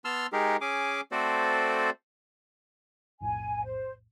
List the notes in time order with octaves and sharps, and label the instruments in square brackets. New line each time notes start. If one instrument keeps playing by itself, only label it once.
[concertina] B3 A5 C6 E6 F6
G#3 D#4 G4 G#4 A#4
C#4 G#4 G#5 D6
A3 C4 F#4 A4 C5 D5
[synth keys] B1 F2 A2 [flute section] G#5
[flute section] C5